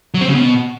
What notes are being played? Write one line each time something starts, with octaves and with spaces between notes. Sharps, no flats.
F#3
C4
C#3
B2